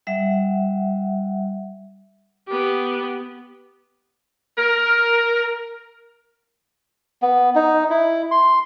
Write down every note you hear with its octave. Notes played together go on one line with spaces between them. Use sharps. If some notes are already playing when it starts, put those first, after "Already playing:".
G3 E5 F#5
B3 G4
A#4
B3
D#4
E4
C6